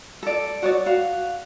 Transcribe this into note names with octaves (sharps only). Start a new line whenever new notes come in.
A4 D5
F#4 C#5 D5
F#4 F5